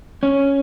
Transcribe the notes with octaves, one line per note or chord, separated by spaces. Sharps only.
C#4